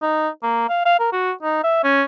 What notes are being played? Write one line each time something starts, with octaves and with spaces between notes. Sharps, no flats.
D#4
A#3
F5
F5
A#4
F#4
D#4
E5
C#4